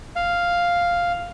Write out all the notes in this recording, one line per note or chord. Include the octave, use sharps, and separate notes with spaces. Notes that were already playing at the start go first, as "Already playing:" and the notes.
F5